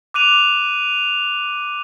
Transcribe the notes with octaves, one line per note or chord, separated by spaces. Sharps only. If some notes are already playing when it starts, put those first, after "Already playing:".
D6 F#6 D#7 F7